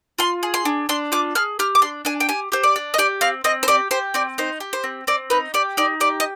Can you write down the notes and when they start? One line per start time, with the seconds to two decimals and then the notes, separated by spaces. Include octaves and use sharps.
0.19 F4 C6
0.43 G#4
0.54 C6
0.65 D4
0.89 D4 C6
1.12 F4 D6
1.35 G#4 F6
1.59 G4 F6
1.75 D6
1.82 D4 C6
2.05 D4 G#5
2.20 G5
2.29 G4 G#5
2.52 G4 C5
2.63 D5
2.76 D4
2.94 D#5
2.98 G4 D5
3.21 C4 F5
3.44 C4 D#5
3.63 C5
3.68 G4 D5
3.91 G4 C5
4.14 C4 D5
4.38 D#4 C5
4.60 G4
4.73 C5
4.84 C4
5.07 C4 D5
5.30 D#4 B4
5.54 G4 D5
5.77 D#4 D5
6.00 G4 D5
6.20 D#5